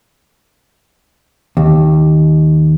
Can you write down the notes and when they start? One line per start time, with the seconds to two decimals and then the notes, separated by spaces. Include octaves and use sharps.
1.57 D#2